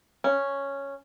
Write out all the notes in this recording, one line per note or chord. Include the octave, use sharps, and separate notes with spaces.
C#4